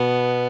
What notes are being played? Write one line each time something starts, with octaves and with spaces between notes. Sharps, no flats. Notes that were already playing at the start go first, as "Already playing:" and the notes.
Already playing: B2 B3